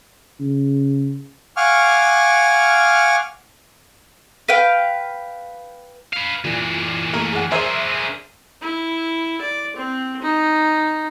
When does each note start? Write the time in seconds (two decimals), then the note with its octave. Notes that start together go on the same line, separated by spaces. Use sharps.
0.40 C#3
1.57 F5 F#5 G#5 C#6 D6 F6
4.48 B4 F5 G5
6.13 B4 F5
6.45 A#2 E3 D4
7.13 A3 A#3 A#4
7.33 G#4 F#5
7.51 D4 G#4 A#4 C5 E5
8.62 E4
9.42 D5
9.76 C4
10.22 D#4